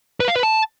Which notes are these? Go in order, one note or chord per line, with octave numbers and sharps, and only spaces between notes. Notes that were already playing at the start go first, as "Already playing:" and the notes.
B4
F5
B4
A5